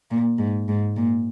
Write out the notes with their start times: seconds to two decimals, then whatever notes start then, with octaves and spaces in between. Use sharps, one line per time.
0.11 A#2
0.39 G#2
0.68 G#2
0.97 A#2